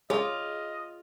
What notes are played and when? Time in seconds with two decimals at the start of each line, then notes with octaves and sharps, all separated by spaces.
0.10 F4 G#4 C#5 D#5 F5 G#5